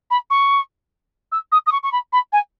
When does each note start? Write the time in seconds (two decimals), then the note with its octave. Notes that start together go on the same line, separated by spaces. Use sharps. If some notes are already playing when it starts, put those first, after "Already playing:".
0.11 B5
0.30 C#6
1.32 E6
1.52 D#6
1.67 D#6
1.72 C#6
1.83 C#6
1.92 B5
2.13 B5
2.33 G#5